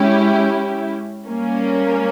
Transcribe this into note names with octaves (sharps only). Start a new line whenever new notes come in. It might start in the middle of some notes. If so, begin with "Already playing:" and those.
Already playing: G#3 C#4 E4 G4
G3 A#3 C#4